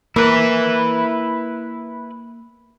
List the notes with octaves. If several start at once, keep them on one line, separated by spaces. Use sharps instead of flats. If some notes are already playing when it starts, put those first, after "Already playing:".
A#3 E4 B4